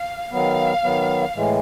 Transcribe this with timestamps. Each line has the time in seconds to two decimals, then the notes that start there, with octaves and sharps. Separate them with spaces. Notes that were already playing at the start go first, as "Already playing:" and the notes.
Already playing: F5
0.31 D#3 F#3 B3 F5
0.83 D#3 F#3 B3
1.36 A2 E3 G#3